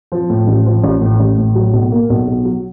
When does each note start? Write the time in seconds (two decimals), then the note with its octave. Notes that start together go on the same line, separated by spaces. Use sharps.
0.12 F3
0.30 A2
0.47 A1
0.66 F3
0.84 A1
1.02 A2
1.20 A1
1.38 A2
1.55 F#3
1.73 B1
1.92 A#3
2.09 B1
2.27 B1
2.45 F#3